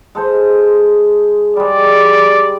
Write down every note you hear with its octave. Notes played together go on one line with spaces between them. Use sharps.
G#3 A4 C5
G3 G#3 D5